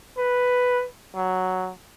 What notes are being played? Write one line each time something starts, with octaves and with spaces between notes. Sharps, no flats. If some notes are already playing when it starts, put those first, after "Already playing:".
B4
F#3